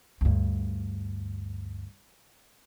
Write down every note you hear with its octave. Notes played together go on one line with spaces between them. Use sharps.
D2 G2